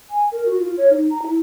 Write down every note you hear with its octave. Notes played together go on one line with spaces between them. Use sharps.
G#5
A#4
F#4
F4
C#5
D#4
A#5
E4